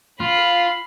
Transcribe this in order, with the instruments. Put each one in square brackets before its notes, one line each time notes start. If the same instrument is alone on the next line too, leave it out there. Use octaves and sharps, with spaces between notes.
[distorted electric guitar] F4 [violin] B5 C7